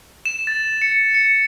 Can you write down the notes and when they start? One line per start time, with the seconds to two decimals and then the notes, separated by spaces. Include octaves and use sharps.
0.25 E7
0.47 A6
0.82 C#7
1.14 C#7